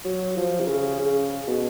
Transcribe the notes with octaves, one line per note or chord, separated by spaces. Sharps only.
F#3
F3
C3
C#3
C#3
B2